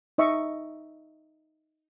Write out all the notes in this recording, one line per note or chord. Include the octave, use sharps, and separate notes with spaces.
D#4 D#5 E5 C#6